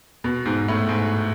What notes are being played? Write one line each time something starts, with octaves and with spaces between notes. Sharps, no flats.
B2
G#2
A2
G#2